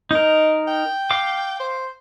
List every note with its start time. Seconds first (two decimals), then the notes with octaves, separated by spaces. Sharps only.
0.11 D#4 A#4 D#5
0.67 G5
1.11 F5 D6
1.60 C5